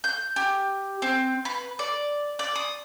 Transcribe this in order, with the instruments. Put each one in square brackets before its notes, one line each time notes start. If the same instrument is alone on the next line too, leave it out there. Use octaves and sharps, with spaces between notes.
[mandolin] G6
G4
C4
B4
D5
D5
D#6